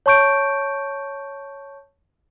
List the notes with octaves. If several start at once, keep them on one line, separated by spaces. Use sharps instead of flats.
C#5 A5 C#6 G6 D7